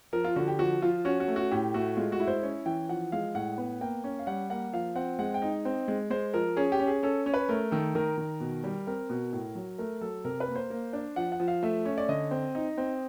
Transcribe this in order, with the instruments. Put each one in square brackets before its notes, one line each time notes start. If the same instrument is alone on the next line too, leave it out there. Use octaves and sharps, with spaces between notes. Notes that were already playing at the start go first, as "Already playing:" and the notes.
[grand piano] F3 A#4
F4
D3 F#4
G4
F3 F#4
F3 F4
C#4 F#4
F#4
A3
F#4
A2 G4
A3 F#4
G#3 F4
F#4
E4
C5
C#4 C#5
E3 G5
F3 F#5
G#3 F5
A2 F#5
B3
A#3 G5
C#4
F5
G3 F#5
A#3 F#5
F3 F5
C4 F#5
G#3 F#5
G5
D#4
C4
G#3
G#3 C5
F3 A#4
C#4 G#4
G4
C#4
G#4
C#4 A4
C#4
B4
A3 A#4
D#3 A4
D#3 A#4
D#3
B2
G3
C4 A#4
B2
A2
F#3
A3 A#4
F#3 A4
C3 A#4
B4
A#3
C5
A#3
D4
F3 F#5
F#5
F3
F5
A3 E5
C#4
D5
D3 D#5
C4
D#4
C4